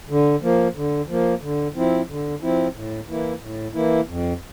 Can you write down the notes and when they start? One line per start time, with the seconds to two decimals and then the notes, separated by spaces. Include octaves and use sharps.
0.09 D3
0.42 F3 A#3
0.75 D3
1.08 F3 A#3
1.41 D3
1.75 F3 C4 E4
2.09 D3
2.41 F3 C4 E4
2.74 A2
3.08 E3 A#3 E4
3.41 A2
3.74 E3 A#3 E4
4.07 F2